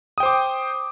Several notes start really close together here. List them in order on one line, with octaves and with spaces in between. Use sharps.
D#6 G5 C5 D6